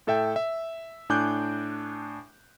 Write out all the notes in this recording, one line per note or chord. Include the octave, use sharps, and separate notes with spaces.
A2 A4 E5 G5
E5
A2 D4 G#5 D6 F#6 G6